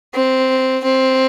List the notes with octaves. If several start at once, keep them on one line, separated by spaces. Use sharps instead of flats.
C4
C4